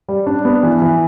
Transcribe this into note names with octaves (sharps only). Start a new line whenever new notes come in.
G3
D4
B3
E3
E3